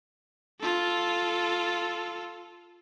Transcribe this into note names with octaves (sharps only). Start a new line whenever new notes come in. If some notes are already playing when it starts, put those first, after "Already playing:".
F4 A4